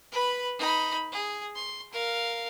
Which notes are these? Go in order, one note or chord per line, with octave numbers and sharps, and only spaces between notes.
B4 B5
D#4 B5
G#4
C6
A#4 F5